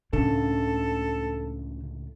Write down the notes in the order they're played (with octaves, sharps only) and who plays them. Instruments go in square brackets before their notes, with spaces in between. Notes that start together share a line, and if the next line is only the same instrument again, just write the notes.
[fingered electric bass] C#2 A2 D4 [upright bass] C#3 [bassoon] A4